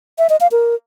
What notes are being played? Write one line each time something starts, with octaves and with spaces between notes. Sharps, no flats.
E5
D#5
F5
A#4